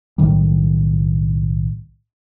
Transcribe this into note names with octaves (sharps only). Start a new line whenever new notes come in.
B1 A2 D#3 G3